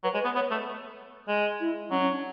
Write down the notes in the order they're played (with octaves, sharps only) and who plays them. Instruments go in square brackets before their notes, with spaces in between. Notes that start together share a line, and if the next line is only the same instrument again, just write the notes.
[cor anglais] F#3 [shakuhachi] B4
[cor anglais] G#3 [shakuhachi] C#5
[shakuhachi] B4
[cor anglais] B3
[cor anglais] B3 [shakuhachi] C#5
[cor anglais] A3
G#3
[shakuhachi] E4
[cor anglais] F#3 [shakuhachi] C#4
[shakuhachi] C#4
D4